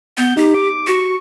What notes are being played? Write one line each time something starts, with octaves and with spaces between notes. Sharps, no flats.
B3 G6
D#4 G4
D6
F#4 C#6